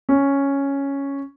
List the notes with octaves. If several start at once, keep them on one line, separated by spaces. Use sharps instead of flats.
C#4